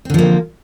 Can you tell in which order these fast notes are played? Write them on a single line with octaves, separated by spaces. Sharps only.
C4 D3 F3 A#3